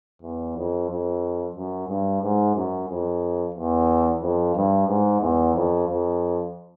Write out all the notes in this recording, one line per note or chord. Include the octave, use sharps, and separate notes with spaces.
E2
F2
F2
F#2
G2
G#2
F#2
F2
E2
F2
G2
G#2
E2
F2
F2